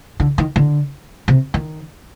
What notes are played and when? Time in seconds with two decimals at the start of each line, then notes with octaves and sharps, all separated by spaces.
0.20 D3
0.38 D#3
0.56 D3
1.28 C3
1.54 D#3